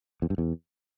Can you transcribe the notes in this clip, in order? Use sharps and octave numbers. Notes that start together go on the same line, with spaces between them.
E2
G2
E2